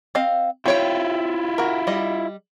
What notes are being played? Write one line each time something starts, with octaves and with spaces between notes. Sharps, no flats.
C4 D#5 F5
C4 E4 F4 C#5 G5
F#4 A#4
G3 D#5